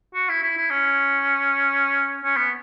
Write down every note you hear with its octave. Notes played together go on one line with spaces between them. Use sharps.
F#4
E4
E4
E4
C#4
C#4
B3